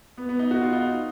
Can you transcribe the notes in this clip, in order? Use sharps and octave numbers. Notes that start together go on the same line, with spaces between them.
B3
B3
D#4
F#4
F4
D#4